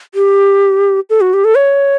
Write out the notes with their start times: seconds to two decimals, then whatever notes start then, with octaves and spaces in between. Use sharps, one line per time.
0.15 G4
1.10 A4
1.21 F#4
1.34 G4
1.45 A4
1.56 C#5